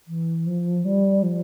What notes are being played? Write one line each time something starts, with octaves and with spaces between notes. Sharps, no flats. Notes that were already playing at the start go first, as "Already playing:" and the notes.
E3
F3
G3
F3